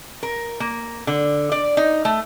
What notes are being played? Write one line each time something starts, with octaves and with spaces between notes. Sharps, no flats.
A#4
A#3
D3
D5
D#4
A3